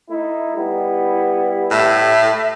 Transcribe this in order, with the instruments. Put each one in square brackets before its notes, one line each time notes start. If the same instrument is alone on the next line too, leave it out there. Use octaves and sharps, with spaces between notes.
[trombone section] A3 D#4 E4
G3 B3 E4
[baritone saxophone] A2 [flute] E5